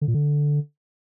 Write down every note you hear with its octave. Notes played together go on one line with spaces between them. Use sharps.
D3
A#2
D3